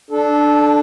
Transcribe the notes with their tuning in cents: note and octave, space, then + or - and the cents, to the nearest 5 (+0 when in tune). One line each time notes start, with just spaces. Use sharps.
D4 +10 A4 -15